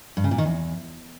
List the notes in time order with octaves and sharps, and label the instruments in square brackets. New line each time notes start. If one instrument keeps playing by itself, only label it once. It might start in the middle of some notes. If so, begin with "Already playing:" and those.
[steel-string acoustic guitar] G2
C#3
A#2
D#3
E2